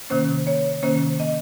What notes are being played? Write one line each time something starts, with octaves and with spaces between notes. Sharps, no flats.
C3 D#3 A#3 C#4 C5
C#5
C3 D#3 A#3 C#4 C5
D#5